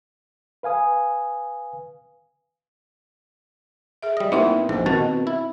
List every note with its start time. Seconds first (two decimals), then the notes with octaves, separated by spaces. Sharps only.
0.63 B4 F5 G#5 D#6
4.02 G#4 E5
4.17 G3 D#5
4.32 A#2 B3 C4 D#4 E4 E5
4.69 A#1 G#2 C5
4.86 B2 D#3 C4 F#4
5.27 E4